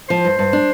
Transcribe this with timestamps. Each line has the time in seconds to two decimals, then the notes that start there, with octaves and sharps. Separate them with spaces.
0.10 F3 C5
0.25 G2
0.39 G2
0.53 D4